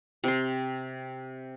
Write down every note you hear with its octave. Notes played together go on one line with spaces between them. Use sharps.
C3 C6